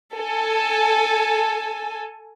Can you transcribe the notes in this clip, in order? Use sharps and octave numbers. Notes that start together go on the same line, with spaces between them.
A4 G#5